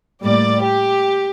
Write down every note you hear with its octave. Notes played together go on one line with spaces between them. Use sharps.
A2 G3 A#3 D5
G4